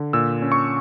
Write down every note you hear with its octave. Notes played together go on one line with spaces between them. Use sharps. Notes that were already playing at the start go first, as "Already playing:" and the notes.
Already playing: D3
A#2 E6
C#4
C#6